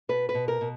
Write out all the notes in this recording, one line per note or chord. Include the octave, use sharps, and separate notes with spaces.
B2 B4
B4
B2
A#4
B2